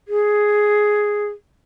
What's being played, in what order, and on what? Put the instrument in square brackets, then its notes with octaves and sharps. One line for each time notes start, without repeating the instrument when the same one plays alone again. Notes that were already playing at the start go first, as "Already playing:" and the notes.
[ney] G#4